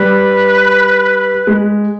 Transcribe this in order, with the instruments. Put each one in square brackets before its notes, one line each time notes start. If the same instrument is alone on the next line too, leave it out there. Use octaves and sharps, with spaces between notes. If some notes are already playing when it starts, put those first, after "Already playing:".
Already playing: [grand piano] G3 [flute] B4
[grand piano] G#3